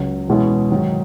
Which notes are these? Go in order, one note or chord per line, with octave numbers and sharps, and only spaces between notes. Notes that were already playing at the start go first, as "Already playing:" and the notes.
Already playing: C#2 C#3 F#3
E2 B2 G#3 C#4 E4
G#2 D#3 F#3